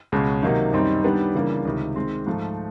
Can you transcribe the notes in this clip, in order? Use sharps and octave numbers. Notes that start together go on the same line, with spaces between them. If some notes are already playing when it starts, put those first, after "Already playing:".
C#2 B2 G#3 C#4
C3 D#3 F#3 A#3 D#4
F#2 D#3 G3 C4 D#4
D#3 G3 B3 D4 G4
C#3 E3 G3 A#3 D4
C#2 C3 D#3
D#3 G#3 C4
G#2 F3 A3